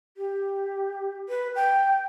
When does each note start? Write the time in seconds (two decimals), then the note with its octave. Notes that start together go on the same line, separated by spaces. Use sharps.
0.17 G4
1.29 B4
1.56 G5